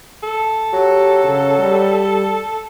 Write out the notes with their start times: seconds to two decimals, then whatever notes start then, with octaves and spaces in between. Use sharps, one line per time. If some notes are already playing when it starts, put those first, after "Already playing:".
0.23 A4
0.73 F#3 G4
1.24 C#3
1.58 G3